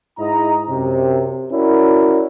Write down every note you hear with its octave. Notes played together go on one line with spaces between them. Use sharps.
G#2 E4 D#5 A#5
F#2 C3
C#4 E4 F#4 A#4 C#5 D5